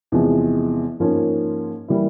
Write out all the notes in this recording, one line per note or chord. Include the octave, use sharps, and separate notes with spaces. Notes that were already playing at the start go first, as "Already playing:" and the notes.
E2 C3 F3 G#3
G#2 F3 A#3 C#4
E3 G3 A#3 E4